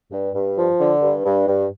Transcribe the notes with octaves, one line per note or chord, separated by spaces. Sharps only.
G2
G2
F3
D3
G2
G2
G2